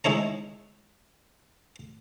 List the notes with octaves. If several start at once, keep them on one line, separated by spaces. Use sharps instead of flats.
G#3 D#4 E4 C#5 A#5